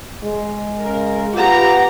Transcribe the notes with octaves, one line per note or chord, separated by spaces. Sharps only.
G#3
C#3 A#4
B3 F4 G4 A#5